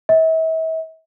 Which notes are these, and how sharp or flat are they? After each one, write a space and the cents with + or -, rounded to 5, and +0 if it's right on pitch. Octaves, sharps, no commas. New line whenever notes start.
E5 -40